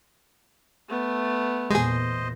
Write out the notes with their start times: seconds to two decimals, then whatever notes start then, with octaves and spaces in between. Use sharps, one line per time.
0.88 A3 B3
1.71 E2 A#2 G#3 G#4 C5 D#5